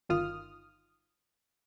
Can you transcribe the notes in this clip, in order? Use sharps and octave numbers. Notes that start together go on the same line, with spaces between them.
G1 D#3 F4 D#6 F6